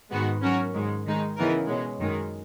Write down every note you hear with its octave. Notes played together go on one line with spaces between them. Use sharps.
G#2 D#3 G#3 B3 F#4
F#3 C#4 F#4 A#4
G#2 D#3 G#3
D#3 G#3 D#4
C#3 E3 B3 D#4 A#4
B2 G#3 C#4
F#2 D#3 G#3